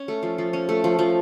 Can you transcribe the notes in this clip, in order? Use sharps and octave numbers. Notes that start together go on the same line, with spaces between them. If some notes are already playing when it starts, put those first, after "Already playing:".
Already playing: C#4
A3
F3
F3
C#4
A3
F3
F3